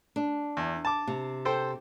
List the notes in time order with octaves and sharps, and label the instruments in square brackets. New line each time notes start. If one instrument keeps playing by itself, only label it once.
[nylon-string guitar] D4
[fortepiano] E2
A5 D6
[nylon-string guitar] C3
[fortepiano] A4 C5 G5